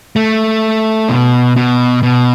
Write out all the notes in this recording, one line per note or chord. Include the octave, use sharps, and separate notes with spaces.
A3
B2
B2
B2